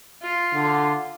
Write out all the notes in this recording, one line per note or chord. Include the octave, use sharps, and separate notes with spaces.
F4
D3